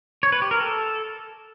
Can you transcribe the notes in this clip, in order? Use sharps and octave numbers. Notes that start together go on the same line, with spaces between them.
C#5
B4
G4
A#4
A4